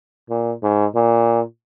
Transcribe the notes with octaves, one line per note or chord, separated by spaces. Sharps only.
A#2
G#2
A#2